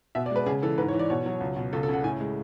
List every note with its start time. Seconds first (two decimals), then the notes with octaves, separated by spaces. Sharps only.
0.15 B2 E5
0.26 D5
0.31 G#3 B4
0.46 C#3 G#4
0.62 E3 A4
0.78 G#2 B4
0.88 C#5
0.93 E3
0.99 D5
1.10 B2 C#5
1.26 F#3
1.41 C#2
1.56 B2
1.73 C#2 A4
1.83 A4
1.89 C#3 F#5
2.04 A2 G#5
2.20 G#3